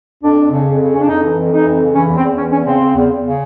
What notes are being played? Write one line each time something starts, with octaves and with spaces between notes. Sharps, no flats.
F2 D4
F2
C#3
F2
C#3
F2 C#4
D4
F2 D#4
E3
F2
E3 D#4
F2
C#3
E3 C#4
E2
C4
E2
E3 C#4
E2 C#4
C#3 C4
C#3
E2
E2
C#3